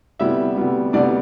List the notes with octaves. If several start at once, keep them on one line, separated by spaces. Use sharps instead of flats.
D2 C3 G3 B3 E4 E5
D2 C3 G3 B3
D2 C3 G3 B3 D4 D5